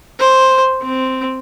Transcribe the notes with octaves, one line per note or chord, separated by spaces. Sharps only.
C5
C4